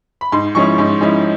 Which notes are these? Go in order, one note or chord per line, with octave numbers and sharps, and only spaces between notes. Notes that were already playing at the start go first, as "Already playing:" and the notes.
B5
G#2 C6
F3 G#3 C#4 E4 C#6
G#2
F3 G#3 C#4 E4